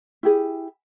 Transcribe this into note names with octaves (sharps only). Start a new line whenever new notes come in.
E4 G4 G#4